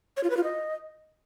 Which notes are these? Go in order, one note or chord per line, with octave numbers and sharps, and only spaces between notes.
C#5
F4
B4
F4
D#5